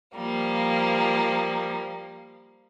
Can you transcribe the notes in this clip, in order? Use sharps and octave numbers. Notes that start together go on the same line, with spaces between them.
F3 G3 A#3